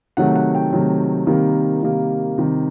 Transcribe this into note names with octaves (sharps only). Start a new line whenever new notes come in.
C3 D#3 F#3 A3 F#5
F#5
G5
C3 D#3 F#3 A3
C3 D#3 G3 A#3
C3 D#3 G3 A#3
C3 D#3 G3